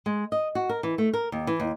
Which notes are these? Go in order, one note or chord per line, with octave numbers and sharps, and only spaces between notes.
G#3
D#5
F#4
A#4
E3
A3
A#4
D#2
E3
D#2